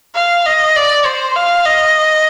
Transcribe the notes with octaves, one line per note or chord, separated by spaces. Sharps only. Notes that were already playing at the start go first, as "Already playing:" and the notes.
F5
D#5
D5
C5
F5
D#5